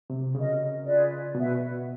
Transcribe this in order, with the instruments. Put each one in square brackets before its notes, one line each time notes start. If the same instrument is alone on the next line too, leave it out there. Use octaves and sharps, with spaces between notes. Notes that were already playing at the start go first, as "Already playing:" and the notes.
[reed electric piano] C3
[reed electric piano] C#3 [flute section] F#4 A#4 D#5
[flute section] F4 G#4 B4 D5
[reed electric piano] B2 [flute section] F#4 B4 E5